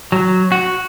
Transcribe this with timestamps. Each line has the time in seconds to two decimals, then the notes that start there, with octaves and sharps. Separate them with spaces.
0.12 F#3
0.52 F#4